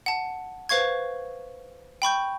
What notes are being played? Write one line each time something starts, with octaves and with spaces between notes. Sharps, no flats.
F#5 A5
B4 C5 F5 C#6 G#6
G5 B5 C#6 G6